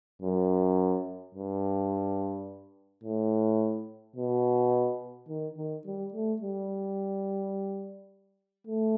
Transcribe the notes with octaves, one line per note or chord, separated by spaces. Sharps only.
F#2
G2
A2
B2
D#3
D#3
G3
A3
G3
A3